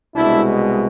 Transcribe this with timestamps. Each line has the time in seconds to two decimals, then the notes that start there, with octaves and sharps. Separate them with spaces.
0.15 C2 B2 G#3 D4 E4